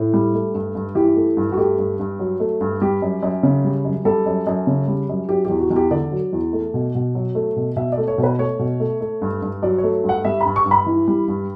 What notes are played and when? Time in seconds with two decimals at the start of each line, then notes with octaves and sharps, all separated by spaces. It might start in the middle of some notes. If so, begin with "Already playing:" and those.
Already playing: A2
0.14 G3
0.34 A3
0.54 G2
0.75 G2
0.95 E3 G4
1.16 A3
1.37 G2
1.52 F#4
1.58 A3 G4
1.79 G2
2.00 G2
2.19 F#3
2.40 A3
2.61 G2
2.81 G3 G4
3.02 F#2
3.23 F#2
3.43 C#3
3.64 G3
3.85 F#2
4.05 G3 A4
4.26 F#2
4.47 F#2
4.67 C#3
4.88 G3
5.09 F#2
5.29 F#3 G4
5.45 E2 G4
5.60 F#4
5.70 E2
5.76 G4
5.91 D3 D5
6.12 F#3
6.33 E2
6.53 A3
6.74 B2
6.95 B2
7.15 F#3
7.35 A3
7.56 B2
7.76 B2 E5
7.92 D5
7.98 A3
8.08 C#5
8.18 B2
8.23 B4
8.39 A3 C#5
8.59 B2
8.80 A3
9.01 A3
9.22 G2
9.42 G2
9.62 F#3 D5
9.78 C#5
9.83 A3
10.04 G2
10.09 F#5
10.25 G3 E5
10.41 G2 B5
10.56 C#6
10.66 G2
10.71 B5
10.86 E3
11.08 G3
11.28 G2